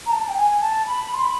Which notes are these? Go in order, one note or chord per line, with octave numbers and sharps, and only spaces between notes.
A#5
A5
G5
G#5
A5
B5
C6
B5